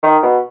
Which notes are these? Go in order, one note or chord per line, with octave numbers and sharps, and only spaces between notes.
D#3
B2